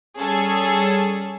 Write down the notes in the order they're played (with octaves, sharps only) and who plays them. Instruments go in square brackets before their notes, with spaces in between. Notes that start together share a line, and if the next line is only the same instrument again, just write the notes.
[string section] G3 C#4 G#4 A4